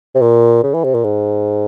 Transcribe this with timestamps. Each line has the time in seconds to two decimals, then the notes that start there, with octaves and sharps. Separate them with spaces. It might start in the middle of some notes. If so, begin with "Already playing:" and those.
0.15 C3
0.21 A#2
0.63 C#3
0.74 E3
0.84 C3
0.94 A#2
1.04 G#2